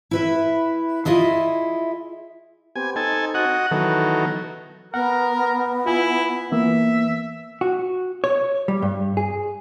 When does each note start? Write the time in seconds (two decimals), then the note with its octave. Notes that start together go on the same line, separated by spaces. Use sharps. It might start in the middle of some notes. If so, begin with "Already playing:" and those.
0.11 E4 B4 E5
1.05 E4 F4 G#4 D#5 E5
2.76 B3 C4 G4 G#5
2.96 C4 D#4 A4 G#5
3.34 F#4 D#5 F#5
3.71 D#3 E3 F#3 B3 A4
4.94 B3 A#4 F#5
5.86 E4 F4 G#5
6.52 E3 A#3 B3 E5
7.61 F#4
8.24 C#5
8.68 G3
8.82 G2
9.17 G#4